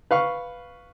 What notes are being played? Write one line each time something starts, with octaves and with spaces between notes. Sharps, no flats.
B4 F5 C#6